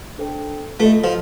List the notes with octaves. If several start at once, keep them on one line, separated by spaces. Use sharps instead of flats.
D4 A4 C5 G5
A3 F4 A4 D#5
F3